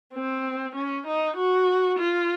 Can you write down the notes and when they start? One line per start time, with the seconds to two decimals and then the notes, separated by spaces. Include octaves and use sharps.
0.14 C4
0.76 C#4
1.07 D#4
1.36 F#4
1.99 F4